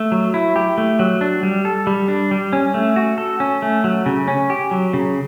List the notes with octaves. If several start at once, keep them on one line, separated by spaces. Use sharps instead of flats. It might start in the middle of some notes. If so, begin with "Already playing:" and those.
Already playing: A3
F#3
E4
G4
A3
F#3
D4
G3
A4
G3
D4
G3
C#4
A3
F#4
A4
C#4
A3
F#3
C#3
C#4
G4
F#3
C#3